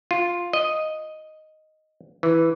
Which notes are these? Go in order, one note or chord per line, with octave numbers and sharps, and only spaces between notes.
F4
D#5
E3